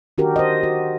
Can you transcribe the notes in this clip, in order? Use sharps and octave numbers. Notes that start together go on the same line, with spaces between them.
D#3 D4 F#4 G4 A#4
C5 D#5
F#4